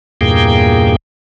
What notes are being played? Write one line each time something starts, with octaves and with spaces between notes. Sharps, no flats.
E2 G2 A#2 A#3 G#4 G5